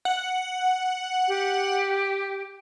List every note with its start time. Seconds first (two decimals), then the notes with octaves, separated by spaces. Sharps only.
0.05 F#5
1.28 G4